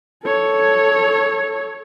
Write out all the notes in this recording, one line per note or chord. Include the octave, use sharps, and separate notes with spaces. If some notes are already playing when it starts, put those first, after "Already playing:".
A4 C#5